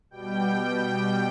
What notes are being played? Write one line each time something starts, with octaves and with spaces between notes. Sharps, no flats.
B2 G3 G5